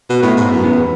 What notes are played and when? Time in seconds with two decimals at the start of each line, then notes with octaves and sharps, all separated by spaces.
0.10 B2
0.22 A2 B3
0.37 G#2
0.51 F#2
0.64 E2 B3